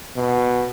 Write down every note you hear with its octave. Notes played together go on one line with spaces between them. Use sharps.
B2